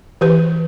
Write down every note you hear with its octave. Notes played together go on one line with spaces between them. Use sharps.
E3 G4 B4